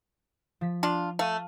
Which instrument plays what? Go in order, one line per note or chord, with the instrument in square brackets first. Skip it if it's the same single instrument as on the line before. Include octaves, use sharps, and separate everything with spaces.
[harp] F3 B6
[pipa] D4 F4
[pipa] A3 [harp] F5 D#7